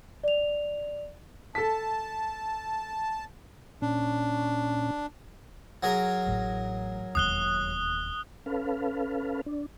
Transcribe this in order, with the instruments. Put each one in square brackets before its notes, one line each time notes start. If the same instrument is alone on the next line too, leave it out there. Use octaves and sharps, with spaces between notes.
[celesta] D5 F7
[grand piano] A4 B6 [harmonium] A5
[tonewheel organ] A#2 C#4 [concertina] D4
[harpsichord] F#3 G#4 A#4
[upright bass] A1 A2
[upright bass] E1 D#2 [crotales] D#6 F#6 G7
[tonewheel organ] C#4 A4 B4 F5
D4